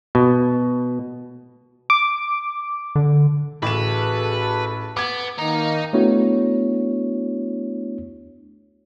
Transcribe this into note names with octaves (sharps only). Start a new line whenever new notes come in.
B2
D6
D3
A1 F#4 G#4 A4 B4 E7
B3 D6 G#6
D#3 A#3 D#4
A3 B3 D4 E4 F#4 C#5